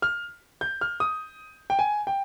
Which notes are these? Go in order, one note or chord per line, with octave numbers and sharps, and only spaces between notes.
F6
G6
F6
D#6
G5
G#5
G5